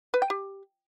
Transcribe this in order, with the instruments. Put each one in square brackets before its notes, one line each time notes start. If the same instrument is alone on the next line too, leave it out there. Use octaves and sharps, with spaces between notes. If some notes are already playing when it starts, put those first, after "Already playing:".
[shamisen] B4
G5
G4